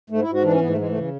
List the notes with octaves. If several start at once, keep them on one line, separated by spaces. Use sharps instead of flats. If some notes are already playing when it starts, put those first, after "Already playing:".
G#2 A3
E4
G#2
F#4
E3 D4
C#4
G#2 B3
A3
E3 G#3
A3
C#3